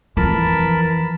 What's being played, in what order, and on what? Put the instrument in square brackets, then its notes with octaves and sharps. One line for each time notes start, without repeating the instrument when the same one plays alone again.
[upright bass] F2 F3 [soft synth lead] E3 [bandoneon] A#4 A5 B5